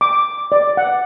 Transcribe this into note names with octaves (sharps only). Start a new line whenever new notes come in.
D6
D5
F#5